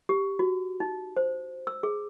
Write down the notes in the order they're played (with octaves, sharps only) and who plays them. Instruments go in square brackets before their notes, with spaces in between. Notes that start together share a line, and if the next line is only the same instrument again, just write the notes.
[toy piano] G4
F#4
D#4
C5
E6
G#4